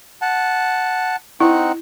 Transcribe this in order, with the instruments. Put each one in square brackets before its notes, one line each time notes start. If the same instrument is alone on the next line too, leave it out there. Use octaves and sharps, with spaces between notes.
[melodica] F#5 A5
[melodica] C4 D#4 F#5 [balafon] E4